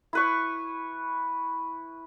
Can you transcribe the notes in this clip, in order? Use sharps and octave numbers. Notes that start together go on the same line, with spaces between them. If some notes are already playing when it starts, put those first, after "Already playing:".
E4 B4 C#6